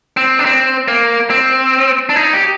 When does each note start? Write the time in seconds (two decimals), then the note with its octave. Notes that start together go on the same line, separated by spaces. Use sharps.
0.17 C4
0.39 D4
0.45 C4
0.88 A#3
1.30 C4
2.09 D4
2.16 D#4
2.33 G4